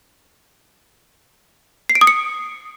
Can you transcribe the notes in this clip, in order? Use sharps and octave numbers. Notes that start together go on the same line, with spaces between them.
C7
D7
D#6
C#7